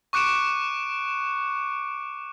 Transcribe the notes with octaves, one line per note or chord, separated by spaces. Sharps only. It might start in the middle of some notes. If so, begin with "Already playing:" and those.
C#6 D6 F#6 C#7 D7 E7